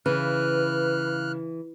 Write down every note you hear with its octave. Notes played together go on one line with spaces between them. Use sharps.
C#3 E3 B4 F6 F#6